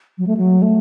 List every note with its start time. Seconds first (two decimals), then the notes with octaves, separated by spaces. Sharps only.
0.18 F#3
0.27 A3
0.37 F#3
0.62 A3